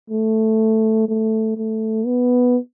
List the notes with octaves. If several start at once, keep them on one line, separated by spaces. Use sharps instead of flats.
A3
A3
A3
B3